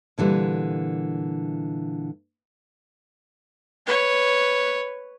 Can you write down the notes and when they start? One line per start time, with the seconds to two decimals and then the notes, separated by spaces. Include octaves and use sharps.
0.18 A#2 D3 E3 G3
3.86 B4 C#5